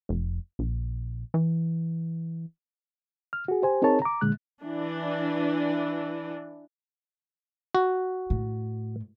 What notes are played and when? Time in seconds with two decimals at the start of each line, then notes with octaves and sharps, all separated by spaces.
0.09 F1
0.59 A#1
1.34 E3
3.33 F6
3.48 F#4 G#4
3.62 G4 C5 G#5
3.82 C4 D#4 G#4 A#4 C#5 A5
4.02 A#5 D6
4.21 A#2 D3 G#3 F#6
4.63 E3 D4
7.75 F#4
8.30 A2